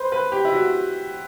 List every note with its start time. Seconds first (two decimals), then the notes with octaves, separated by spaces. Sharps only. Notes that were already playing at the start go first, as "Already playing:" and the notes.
Already playing: B4 C5
0.12 B4
0.32 G4
0.45 E4
0.53 F#4